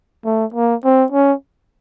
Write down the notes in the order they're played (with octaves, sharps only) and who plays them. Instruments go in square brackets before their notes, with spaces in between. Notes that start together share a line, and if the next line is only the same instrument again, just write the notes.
[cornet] A3
A#3
C4
C#4